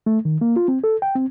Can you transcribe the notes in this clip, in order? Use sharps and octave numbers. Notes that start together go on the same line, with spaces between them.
A3
D#3
A#3
F4
C4
A4
G5
C4